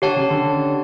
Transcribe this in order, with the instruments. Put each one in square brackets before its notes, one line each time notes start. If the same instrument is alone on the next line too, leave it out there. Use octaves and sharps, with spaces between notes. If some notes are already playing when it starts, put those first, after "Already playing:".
[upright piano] D3 [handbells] G4 C#5 F#5 A5
[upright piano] C#3
D3